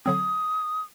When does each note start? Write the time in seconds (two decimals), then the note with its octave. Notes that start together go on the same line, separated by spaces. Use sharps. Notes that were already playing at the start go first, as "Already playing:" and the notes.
0.06 D3 F#3 C4 D#6